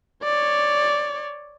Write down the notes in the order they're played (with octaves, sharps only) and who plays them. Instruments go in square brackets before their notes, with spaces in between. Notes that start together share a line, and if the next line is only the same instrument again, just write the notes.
[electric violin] C#5 D5